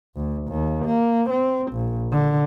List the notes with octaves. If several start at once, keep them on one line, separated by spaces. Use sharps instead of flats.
D2
D#2
A#3
C4
A#1
D3